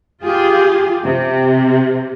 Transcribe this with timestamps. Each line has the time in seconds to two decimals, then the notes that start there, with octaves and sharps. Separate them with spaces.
0.24 F4 G4 G#4
1.05 C3